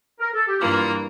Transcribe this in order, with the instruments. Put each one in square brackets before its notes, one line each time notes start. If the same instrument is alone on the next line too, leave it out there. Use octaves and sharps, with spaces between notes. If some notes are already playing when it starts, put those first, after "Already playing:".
[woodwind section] A#4
A4
G4
[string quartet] G2 E3 A#3 [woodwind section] F4